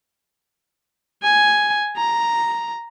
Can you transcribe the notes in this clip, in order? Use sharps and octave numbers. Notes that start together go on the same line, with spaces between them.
G#5
A#5